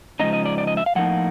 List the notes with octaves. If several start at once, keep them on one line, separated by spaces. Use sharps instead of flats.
C#3 F3 G#3 C4 D#4 D#5
D#5
D5
D5
D#5
E5
F5
A2 F3 A#3 D#4 F#5